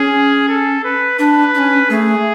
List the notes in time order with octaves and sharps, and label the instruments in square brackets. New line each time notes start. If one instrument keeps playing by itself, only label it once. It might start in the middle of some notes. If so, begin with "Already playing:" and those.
Already playing: [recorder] C#4 [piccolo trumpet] G#4
[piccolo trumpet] A4
B4
[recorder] D4 [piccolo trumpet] B4
[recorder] D4
C#4
[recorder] A3 [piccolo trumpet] G#4